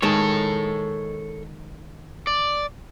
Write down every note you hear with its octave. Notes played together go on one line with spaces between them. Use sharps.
D#3 G#3 A4 C#5 A5
D5